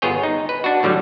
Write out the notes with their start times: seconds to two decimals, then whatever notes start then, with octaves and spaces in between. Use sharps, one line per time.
0.02 G1 B3 F4 G#4 C#5 G5
0.23 D#4
0.49 B4
0.64 D4 F#4
0.83 A2 D3 F#3 G3